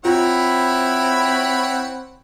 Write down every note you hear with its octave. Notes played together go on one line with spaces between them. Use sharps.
C4 E4 F4 C#5 F#5 B5